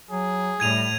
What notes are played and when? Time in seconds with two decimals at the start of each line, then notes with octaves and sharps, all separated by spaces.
0.10 F#3 G#4
0.60 A2 G3 G#6 D#7 F7